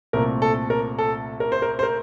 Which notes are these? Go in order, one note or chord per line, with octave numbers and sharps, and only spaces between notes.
C2 A#2 A3 C4 A#4
A4
A#4
A4
A#4
C5
A#4
C5
A#4